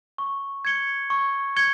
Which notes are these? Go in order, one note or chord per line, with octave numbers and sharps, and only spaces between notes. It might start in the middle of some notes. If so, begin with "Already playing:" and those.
C#6
G#6 C#7 G7
C#6
G#6 C#7 G7